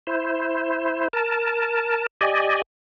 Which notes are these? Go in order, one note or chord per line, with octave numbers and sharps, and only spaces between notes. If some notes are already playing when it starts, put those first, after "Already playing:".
E4 C5
A#4 A5
G4 D5 D#5 G#5